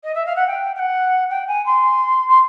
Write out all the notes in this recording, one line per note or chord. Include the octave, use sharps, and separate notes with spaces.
D#5
E5
F5
F#5
G5
G5
F#5
G5
G#5
C6
C6